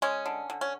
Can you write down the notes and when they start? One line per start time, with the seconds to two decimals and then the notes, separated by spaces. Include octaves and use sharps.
0.02 G#3 C#4
0.26 D3
0.50 D3
0.61 C#4